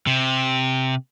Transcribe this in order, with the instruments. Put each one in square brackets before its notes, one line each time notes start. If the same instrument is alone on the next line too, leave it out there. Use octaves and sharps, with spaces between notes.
[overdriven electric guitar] C3